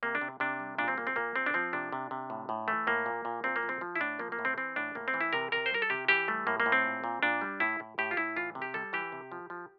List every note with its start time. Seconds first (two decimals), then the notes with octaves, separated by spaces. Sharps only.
0.03 C3 A#3
0.15 D4
0.21 C3
0.40 C3 D4
0.60 G3
0.78 A#2 D4
0.88 C4
0.98 A#2 A#3
1.07 C4
1.16 A#2 A#3
1.36 A#2 C4
1.46 D4
1.54 F3 C4
1.73 C3 D4
1.92 C3
2.11 C3
2.30 A2
2.49 A2
2.68 E3 A3
2.87 A2 A#3
3.06 A#2
3.25 A#2
3.44 A#2 C4
3.56 A#3
3.63 F3
3.69 C4
3.81 F3
3.96 E4
4.00 A2 D4
4.19 F3 A#3
4.32 A#3
4.39 A2
4.45 C4
4.58 E3 C4
4.76 A2 D4
4.95 A2 A#3
5.08 C4
5.14 E3
5.21 E4
5.33 C3 A#4
5.52 C3 A#4
5.66 C5
5.71 G3 A#4
5.82 A4
5.90 C3 G4
6.08 E3 G4
6.28 G3 A3
6.47 A2 A#3
6.60 A#3
6.66 A2
6.72 C4
6.85 A#2
7.04 A#2
7.23 A#2 D4
7.41 G3
7.60 A2 E4
7.80 A2
7.98 A2 G4
8.11 F4
8.17 A2 E4
8.36 E3 F4
8.55 C3
8.62 G4
8.74 G3 A4
8.93 E3 G4
9.12 C3
9.32 F3
9.50 F3